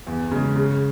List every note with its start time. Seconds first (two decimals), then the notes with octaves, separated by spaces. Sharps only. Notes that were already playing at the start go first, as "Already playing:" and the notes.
0.07 E2
0.31 C#3 G#3
0.56 C#3